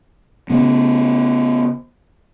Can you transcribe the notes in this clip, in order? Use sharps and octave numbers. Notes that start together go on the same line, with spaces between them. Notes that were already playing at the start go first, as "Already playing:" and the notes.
C#3 B3 C#4